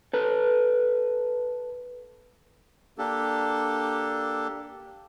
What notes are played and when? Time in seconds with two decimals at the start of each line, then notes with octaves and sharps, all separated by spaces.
0.13 A4 B4
2.98 A#3 D4 G4 A4